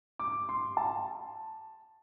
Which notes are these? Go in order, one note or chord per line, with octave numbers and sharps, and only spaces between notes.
D6
C6
A5